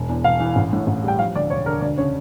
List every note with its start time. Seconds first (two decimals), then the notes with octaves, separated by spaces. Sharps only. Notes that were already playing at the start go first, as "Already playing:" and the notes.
Already playing: E1
0.09 E2
0.24 E1 F5
0.40 E3
0.56 A1
0.73 A2
0.87 A1
1.04 G3 G5
1.19 F3 F5
1.36 D2 D5
1.50 E1 C#5
1.66 D3 A#4
1.81 D2 D5
1.97 C#3 C#5